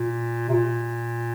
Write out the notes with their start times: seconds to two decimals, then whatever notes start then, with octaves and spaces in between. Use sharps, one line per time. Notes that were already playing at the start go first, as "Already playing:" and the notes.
Already playing: A#2
0.49 C3
0.53 A#2